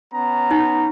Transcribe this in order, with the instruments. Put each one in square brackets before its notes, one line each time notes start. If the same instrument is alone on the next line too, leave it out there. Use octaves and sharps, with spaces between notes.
[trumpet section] B3 C#4 A#5
[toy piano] D#4